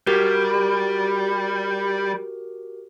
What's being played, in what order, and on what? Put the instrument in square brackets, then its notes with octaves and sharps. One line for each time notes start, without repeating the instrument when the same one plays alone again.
[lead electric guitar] G3 [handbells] F#4 G4 A#4